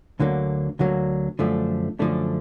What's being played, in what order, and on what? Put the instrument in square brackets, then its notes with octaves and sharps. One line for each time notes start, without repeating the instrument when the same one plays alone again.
[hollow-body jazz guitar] D2 D3 F#3 A#3
D2 D3 F#3 A#3
F#2 D3 F3 A3 D4
F#2 D3 F3 A3 D4